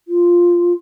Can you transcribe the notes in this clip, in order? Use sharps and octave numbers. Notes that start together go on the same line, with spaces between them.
F4